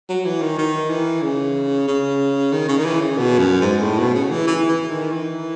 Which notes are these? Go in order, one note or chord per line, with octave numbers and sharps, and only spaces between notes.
F#3
E3
D#3
D#3
E3
C#3
C#3
D#3
C#3
D#3
E3
C#3
B2
F#2
G#2
A2
B2
C#3
E3
E3
E3
D#3
E3